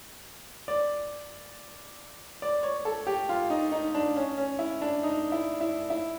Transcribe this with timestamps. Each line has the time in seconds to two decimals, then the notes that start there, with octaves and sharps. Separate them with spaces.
0.68 D5
2.42 D5
2.63 C#5
2.85 A4
3.07 G4
3.29 F4
3.50 D#4
3.72 D#4
3.95 D4
4.16 C#4
4.38 C#4
4.59 E4
4.82 D4
5.03 D#4
5.32 E4
5.61 E4
5.90 E4